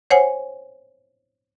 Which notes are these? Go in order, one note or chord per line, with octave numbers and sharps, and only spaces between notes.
C5 C#5 F#5 G#5